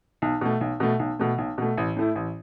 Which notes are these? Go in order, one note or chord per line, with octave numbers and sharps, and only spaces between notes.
B1
B2 A3
B1
B2 A3
B1
B2 A3
B1
B2 A3
A1
A2 A3 E4
A1